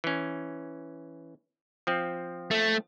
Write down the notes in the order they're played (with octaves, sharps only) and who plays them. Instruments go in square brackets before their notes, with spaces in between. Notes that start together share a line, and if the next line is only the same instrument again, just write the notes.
[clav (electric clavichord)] E3 C#4
F3 C4
[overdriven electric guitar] A3